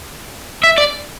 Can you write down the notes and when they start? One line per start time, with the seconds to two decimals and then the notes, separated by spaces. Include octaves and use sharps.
0.64 E5
0.78 D5